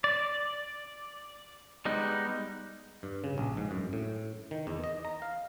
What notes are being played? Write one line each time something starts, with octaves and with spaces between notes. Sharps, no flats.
D5
G3 G#3 B3 D#4
G2
C#3
A#1
G#2
F#2
A2
D#3
E2
D#5
A#5
F5